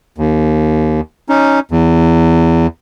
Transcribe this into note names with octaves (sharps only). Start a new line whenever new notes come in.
D#2
C#4 D#4
E2